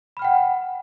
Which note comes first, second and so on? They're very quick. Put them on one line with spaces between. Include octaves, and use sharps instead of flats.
B5 F6 G5 F#5